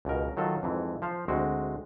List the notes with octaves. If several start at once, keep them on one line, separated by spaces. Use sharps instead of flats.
C#2 B2 A#4
D#3 F#3 F4 A4
F2 G#2 E3
F3 C5 F5
D2 G#3 C4 F#4